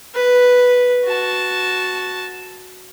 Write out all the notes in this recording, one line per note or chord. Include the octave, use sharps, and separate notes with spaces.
B4
F#4 A5